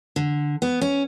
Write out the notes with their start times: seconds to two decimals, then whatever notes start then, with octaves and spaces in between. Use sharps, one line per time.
0.16 D3
0.62 B3
0.81 C#4